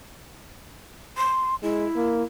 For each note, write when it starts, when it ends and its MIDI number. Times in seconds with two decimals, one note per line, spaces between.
1.17 1.55 84
1.63 1.85 56
1.63 2.23 64
1.96 2.23 58